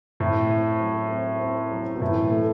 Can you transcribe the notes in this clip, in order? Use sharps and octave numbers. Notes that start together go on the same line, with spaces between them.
A2 C4
C4
F#3
C4
C4
F#3
B2
A2 E3
A3